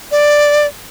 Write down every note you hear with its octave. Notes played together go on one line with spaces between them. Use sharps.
D5